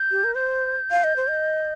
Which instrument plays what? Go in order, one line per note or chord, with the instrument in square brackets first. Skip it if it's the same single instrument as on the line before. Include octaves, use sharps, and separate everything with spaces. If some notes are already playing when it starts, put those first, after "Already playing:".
Already playing: [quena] G6
[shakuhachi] G4
A#4
[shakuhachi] C5 [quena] G6
[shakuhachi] F5
D#5
C5
D#5